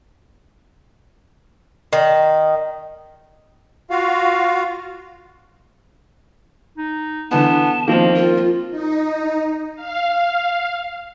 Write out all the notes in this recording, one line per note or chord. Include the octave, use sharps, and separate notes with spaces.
D#3
F4 F#4 F5
D#4
D3 E3 B3 B4 A5
D#3 F3 A#3 C4
F4 A#4
D#4
F5